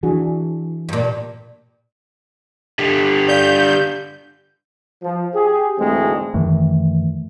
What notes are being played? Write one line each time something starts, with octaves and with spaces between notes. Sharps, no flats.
E3 D4 F#4 G#4
G2 A#2
D3 G3
D5 F5 G6
F3
G4 G#4
D2 G#2 E3 G#3 A3 C4
F#2 D#3 E3 A3